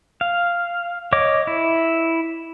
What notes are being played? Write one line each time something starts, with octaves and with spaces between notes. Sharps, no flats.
F5
C#5 D#5 D6
E4